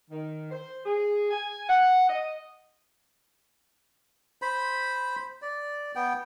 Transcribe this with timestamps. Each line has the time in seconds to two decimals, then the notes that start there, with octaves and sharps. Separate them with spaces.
0.10 D#3
0.51 C5
0.85 G#4
1.31 G#5
1.69 F#5
2.09 D#5
4.42 C5 B5
5.42 D5
5.95 B3 G5